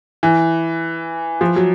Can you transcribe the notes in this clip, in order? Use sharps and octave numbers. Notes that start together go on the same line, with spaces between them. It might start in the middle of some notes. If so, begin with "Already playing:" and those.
E3
F3
F#3